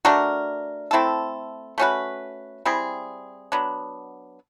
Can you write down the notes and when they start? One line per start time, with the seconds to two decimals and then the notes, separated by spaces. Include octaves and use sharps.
0.05 A3 D4 F#4 A#4
0.91 A3 C4 E4 A4
1.78 A3 C#4 F#4 B4
2.65 G3 C4 E4 G#4
3.52 F#3 B3 D4